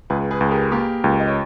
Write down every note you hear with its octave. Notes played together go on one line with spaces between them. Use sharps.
C#2 G#4 B4
G#4 B4
C#2
G4 A#4
A#3 G4 A#4
C#2
D#5
C#5